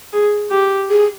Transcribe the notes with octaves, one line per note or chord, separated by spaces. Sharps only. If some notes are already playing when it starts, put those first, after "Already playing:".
G#4
G4
G#4